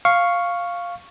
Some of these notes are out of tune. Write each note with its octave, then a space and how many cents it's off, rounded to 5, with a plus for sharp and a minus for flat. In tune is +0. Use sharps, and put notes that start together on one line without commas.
F5 +0 C#6 +0